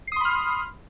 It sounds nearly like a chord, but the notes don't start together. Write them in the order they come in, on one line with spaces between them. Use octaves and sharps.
C7 D#6 C6 B5 F6